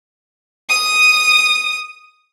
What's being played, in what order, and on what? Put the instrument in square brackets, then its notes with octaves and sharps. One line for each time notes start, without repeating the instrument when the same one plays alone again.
[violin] D#6 D#7